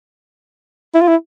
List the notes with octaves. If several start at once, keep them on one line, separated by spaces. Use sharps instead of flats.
E4
F4
E4